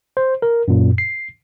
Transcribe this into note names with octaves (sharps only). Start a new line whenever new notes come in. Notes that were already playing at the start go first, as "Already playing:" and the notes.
C5
A#4
F#2 A#2
C7